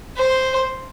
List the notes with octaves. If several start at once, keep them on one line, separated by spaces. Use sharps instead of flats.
C5